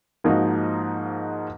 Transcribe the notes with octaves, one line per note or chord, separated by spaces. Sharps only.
G#2 F3 A#3 D#4 F#4